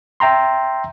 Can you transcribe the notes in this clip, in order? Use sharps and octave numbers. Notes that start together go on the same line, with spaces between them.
E5 G5 A#5 C6